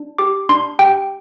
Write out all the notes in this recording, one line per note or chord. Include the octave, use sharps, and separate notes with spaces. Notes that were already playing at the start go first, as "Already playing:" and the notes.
Already playing: D4
G4 D6
D4 C6
G4 G5